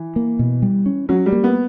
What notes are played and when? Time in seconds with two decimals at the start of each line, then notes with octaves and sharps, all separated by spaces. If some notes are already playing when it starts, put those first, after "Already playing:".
Already playing: E3
0.16 A#3
0.39 B2
0.62 G3
0.86 C#4
1.09 F#3 C#4
1.26 G3
1.32 A#3
1.44 B3